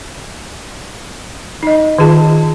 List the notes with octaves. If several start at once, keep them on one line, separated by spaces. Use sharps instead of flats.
D#4 D#5
D#3 F4 G#4 A5